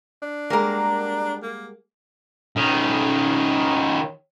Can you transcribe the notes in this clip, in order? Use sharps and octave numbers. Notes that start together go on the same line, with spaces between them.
D4
G3 G#3 A#3 A#4 F#5
A#3
D#3 C#4